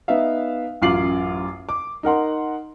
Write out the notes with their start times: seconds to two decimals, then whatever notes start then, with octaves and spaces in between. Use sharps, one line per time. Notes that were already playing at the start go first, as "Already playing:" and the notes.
0.08 B3 D#4 E5 F5
0.82 A1 F#2 F4 D6 C7 F#7
1.69 D6
2.03 D#4 A#4 F#5 C6